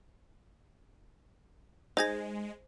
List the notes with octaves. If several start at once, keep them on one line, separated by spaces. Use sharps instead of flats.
G#3 D#4 G#4 C5 G#6 A#6